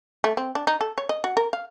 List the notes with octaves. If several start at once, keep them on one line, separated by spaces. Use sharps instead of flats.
A3
C4
D4
D#4
A4
C#5
D#5
F#4
A#4
F5